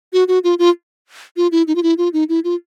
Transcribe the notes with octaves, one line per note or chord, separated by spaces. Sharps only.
F#4
F#4
F4
F4
F4
E4
D#4
F4
E4
F4
D#4
E4
F4